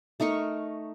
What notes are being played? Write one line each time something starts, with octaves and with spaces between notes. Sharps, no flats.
A3 D#4 A#4 C#6